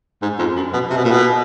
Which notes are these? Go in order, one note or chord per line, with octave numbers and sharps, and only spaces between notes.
G#2
F2
F#2
B2
C3
B2
A#2
B2